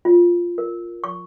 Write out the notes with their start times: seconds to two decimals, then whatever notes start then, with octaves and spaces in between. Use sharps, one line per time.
0.05 F4
0.58 A#4
1.04 C#6